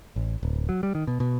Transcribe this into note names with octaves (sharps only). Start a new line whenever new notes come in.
A1
D1
F#3
G3
D#3
B2
B2